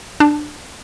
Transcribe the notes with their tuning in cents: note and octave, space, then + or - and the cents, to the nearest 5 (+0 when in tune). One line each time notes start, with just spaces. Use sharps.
D4 +20 A5 +0